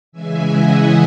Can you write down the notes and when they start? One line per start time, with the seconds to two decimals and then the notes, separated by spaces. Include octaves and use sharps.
0.12 C#3 E3 G#3 E5 G#5
0.50 D#5 F#5